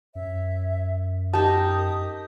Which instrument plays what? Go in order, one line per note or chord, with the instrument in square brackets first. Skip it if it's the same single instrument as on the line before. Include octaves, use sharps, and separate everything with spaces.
[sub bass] F#2 [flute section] C#5 E5
[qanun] D#4 G4 [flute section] A#4 D#6 [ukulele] A5